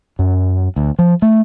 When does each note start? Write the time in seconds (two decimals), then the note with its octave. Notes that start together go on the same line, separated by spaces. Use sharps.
0.19 F#2
0.76 D2
0.99 F3
1.22 A3